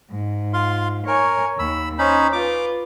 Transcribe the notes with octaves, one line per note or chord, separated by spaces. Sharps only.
G#2
F4 F5 C6
A#4 C#5 G#5
D#2 B5 E6
C#4 D#4 C5 B5
F4 B4 D6